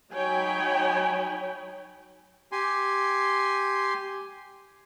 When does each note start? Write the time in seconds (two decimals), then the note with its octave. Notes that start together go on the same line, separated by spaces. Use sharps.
0.14 F#3 D#4 C#5 G5 G#5 B5
2.52 G4 G#5 C6